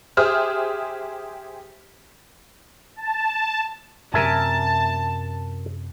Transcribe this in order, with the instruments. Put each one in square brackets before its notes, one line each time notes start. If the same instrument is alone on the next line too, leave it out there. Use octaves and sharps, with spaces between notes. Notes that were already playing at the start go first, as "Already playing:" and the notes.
[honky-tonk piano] G4 G#4 C5 E5 D#6 F6
[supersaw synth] A5
[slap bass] F#2 C3 [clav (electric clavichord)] A#4 E5 G#5 [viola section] A5